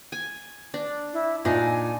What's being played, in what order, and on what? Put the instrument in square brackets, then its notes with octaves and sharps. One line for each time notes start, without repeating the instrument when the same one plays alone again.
[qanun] G#5
D4
[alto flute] E4
[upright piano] A#2 [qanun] D4 D#4 [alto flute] G#5